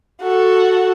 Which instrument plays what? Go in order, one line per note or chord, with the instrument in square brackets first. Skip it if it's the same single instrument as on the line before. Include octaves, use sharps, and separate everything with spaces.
[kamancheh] F#4 A4